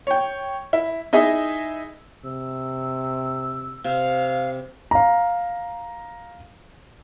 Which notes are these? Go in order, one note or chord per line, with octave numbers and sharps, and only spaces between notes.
C#5 G5
E4
D#4 E4 G#4 D#5 E5
C3 E6
C3 F5
F5 A#5